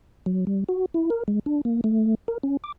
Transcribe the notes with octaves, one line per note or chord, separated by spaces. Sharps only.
F#3
G3
F#4
E4
A#4
G#3
D4
A#3
A3
A#4
C#4
D6